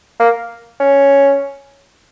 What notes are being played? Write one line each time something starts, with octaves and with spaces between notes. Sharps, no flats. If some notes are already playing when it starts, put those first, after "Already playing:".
A#3
C#4